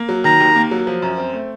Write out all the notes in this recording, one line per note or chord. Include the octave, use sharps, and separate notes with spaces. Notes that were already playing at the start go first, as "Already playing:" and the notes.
Already playing: A#3
F#3
D#3 A#5
D#2
A#3
F#3
F3
F#2
C4
A3